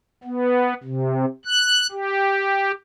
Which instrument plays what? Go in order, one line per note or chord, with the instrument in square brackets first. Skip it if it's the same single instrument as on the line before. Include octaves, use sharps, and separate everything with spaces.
[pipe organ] B3
C3
F#6
G4